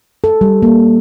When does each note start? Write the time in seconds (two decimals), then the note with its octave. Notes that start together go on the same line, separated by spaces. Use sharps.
0.24 A4
0.41 G3
0.62 A#3